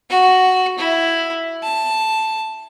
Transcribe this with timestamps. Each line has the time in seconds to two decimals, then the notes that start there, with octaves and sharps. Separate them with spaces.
0.10 F#4
0.78 E4
1.63 A5